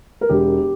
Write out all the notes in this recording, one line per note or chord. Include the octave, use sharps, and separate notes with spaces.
A#4
E1 G4